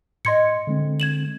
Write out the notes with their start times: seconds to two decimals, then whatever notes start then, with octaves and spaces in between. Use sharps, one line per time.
0.25 A2 D#5 C6 G#6 C#7
0.67 D3 G#3 C4
1.00 G#6 E7 F#7